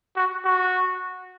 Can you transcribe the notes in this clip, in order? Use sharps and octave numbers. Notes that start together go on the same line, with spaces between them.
F#4
F#4